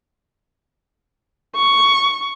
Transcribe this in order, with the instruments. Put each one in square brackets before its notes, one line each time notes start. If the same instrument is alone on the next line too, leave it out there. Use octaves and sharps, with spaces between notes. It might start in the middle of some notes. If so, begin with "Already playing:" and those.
[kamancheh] C#6